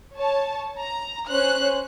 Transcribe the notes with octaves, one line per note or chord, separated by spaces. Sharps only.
C#5 A5
A#5
C#4 C5 C#5 F#6